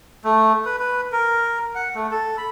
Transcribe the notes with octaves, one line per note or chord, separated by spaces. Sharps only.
A3
B4
B4
A#4
F#5
A3
A4
B5